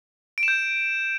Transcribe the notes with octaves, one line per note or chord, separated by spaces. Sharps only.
D7
E7
G6